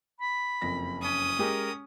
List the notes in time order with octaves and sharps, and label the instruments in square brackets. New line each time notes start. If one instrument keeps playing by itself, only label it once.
[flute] B5
[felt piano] F#1 F2 A#6
[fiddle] C#4 D#6
[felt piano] G#3 G4 [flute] A#4